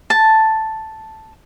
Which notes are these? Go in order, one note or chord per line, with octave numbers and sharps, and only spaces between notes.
A5